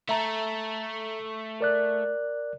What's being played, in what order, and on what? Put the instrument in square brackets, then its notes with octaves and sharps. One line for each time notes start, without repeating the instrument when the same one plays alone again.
[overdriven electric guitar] A3 A4 [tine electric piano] E5 A#5
[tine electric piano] A#4 D5 F#6